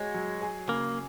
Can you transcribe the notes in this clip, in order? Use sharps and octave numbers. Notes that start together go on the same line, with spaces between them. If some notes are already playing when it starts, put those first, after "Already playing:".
Already playing: G#3 F#4 C#5
F#3
G#4
C#3 A#3